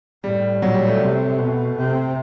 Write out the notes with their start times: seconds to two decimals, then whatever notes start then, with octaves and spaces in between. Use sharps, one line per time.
0.24 A2 G3
0.61 A#2 F#3
0.74 G3
0.87 A3
1.00 C3
1.38 B2
1.77 C3